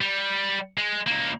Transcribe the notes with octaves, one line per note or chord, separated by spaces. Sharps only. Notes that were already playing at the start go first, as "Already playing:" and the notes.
G3
G#3
C#2 A#3